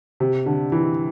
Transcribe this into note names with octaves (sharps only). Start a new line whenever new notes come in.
C3
D3
E3